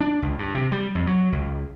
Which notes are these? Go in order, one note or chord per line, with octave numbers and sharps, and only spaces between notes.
D4
C#2
G2
C3
G3
F2
F#3
C#2